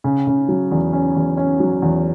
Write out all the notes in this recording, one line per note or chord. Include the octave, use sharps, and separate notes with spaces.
C#3
C#3
F#3
E2
C#4
E2
C#4
F#3
E2